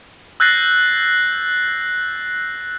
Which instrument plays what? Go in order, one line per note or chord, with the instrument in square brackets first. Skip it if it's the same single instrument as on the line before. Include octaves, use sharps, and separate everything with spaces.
[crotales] E6 F#6 G6 A6 A#6 C7